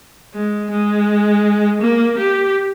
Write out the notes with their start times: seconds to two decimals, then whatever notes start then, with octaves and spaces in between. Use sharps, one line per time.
0.34 G#3
0.70 G#3
1.81 A#3
2.18 G4